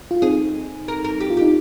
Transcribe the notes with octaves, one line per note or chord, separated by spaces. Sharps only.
F4
C4 D#4 G#4
A#4
A#4
G4
F4
D#4 G4